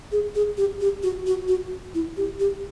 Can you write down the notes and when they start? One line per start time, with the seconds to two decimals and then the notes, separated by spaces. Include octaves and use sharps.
0.12 G#4
0.35 G#4
0.58 G4
0.81 G4
1.03 F#4
1.27 F#4
1.48 F#4
1.94 E4
2.17 G4
2.40 G4